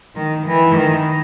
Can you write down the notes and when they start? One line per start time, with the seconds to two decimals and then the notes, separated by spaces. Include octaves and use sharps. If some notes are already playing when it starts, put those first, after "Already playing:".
0.15 D#3
0.46 E3
0.76 D#3